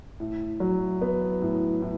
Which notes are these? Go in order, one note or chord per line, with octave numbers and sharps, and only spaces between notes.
A2
F#3
B3
A2
A2